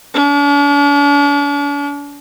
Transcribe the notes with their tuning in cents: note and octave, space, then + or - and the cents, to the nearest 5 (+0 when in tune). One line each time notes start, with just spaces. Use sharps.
D4 -45